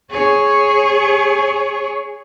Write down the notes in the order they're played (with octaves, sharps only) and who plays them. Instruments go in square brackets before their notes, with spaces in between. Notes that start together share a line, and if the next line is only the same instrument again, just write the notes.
[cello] G#4 C#5